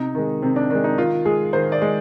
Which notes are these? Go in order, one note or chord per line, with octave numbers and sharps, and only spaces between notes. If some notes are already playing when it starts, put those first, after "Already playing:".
Already playing: C3 D#4
D#3 G#3
C3 C4
D4
D#3 G#3 D4
D#4
D#3 F4
G#3 G#4
D#3 C5
D5
G#3